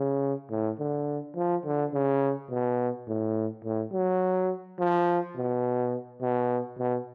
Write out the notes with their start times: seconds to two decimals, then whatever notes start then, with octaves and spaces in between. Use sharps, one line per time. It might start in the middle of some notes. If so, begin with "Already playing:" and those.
Already playing: C#3
0.51 A2
0.79 D3
1.36 F3
1.65 D3
1.94 C#3
2.50 B2
3.08 A2
3.65 A2
3.93 F#3
4.79 F3
5.36 B2
6.22 B2
6.79 B2